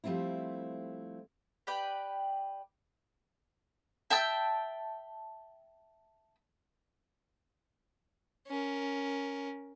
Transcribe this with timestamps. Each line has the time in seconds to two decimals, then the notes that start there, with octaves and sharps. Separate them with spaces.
0.04 F3 G3 A3 C4 E4
1.67 G4 B4 D5 G5
4.10 E5 G5 A5 E6
8.48 C#4 A#4